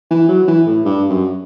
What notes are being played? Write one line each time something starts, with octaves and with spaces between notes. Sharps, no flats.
E3
F#3
E3
A2
G2
F#2